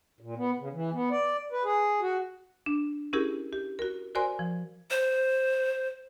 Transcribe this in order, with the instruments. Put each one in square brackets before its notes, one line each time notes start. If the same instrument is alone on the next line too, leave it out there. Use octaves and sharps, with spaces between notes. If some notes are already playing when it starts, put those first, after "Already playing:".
[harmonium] A#2
B3
C#3
E3
B3
D5
B4
G#4
F#4
[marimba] D4
C#4 E4 G4 G#4 A#4
G4
F#4 A#4
F#4 A#4 C5 D5 G#5 C6
F3
[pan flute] C5